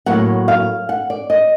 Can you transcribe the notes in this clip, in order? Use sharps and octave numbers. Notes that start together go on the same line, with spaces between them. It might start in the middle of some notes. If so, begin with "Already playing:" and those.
A2 F#3 A#3 F#5
F5
F#5
D5
D#5